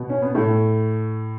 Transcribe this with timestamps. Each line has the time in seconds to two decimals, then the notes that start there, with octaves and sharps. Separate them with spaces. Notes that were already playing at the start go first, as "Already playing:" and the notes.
Already playing: B2
0.09 C#4
0.22 B3
0.35 A2 A3